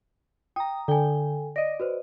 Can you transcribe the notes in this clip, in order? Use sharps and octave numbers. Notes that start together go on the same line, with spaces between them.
G5 A#5 D#6
D3 A4 G5 G#5
D5 D#5 A#6
F#4 B4 C5